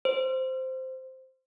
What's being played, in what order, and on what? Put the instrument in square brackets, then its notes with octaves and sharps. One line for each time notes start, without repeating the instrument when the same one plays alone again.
[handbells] C5